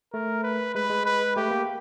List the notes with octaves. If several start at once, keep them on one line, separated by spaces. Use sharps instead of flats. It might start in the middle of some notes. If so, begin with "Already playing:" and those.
A3 A#4
B4
G#3 B4
G#3
B4
A3 G4
A#3